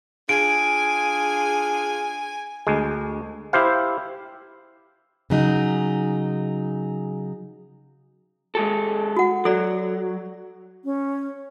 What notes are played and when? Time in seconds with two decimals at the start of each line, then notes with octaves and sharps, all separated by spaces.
0.29 D4 F4 G#4 G#5 D7
2.67 D2 G#3
3.53 E4 G4 C5 F5
5.30 C#3 F#3 D#4
8.55 G#3 G4 A4
9.17 F#4 F#5
9.45 F#3 A4 D5
10.85 C#4